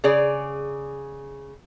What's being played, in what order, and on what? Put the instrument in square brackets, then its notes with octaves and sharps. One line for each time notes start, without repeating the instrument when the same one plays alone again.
[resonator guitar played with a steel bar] C#3 G#4 D5